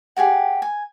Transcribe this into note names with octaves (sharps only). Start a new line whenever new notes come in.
G4 G#4 A#4 F#5
G#5